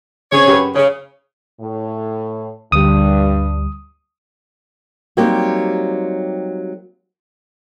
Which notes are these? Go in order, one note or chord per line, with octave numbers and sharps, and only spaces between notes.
C#3 C4 G#4 C#5
F#2 G4 B4
C#3 C#5
A2
D2 G2 G3 D#6
F#3 G3 A#3 C4 D#4 G4